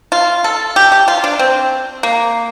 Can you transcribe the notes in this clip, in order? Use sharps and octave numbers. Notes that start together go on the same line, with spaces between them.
F4
A4
G4
G4
F4
D4
C4
A#3